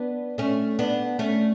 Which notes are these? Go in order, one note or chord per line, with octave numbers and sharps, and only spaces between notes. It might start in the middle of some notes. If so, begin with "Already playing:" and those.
Already playing: B3 D4
A3 C#4
B3 D4
A3 C#4